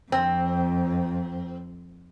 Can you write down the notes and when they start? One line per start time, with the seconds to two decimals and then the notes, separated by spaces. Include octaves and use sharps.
0.12 F2 C4